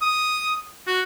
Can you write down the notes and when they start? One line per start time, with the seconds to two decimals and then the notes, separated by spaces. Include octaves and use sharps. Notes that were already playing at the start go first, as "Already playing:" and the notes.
0.01 D#6
0.87 F#4